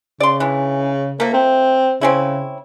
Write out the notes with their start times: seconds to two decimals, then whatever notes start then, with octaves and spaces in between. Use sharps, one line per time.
0.20 C#3 D5 C6
0.40 E3 D4
1.20 F3 A3 A#3
1.33 C4
2.01 C#3 C4 C#4 E4